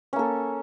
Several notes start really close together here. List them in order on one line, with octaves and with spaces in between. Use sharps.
C#4 A#3 A4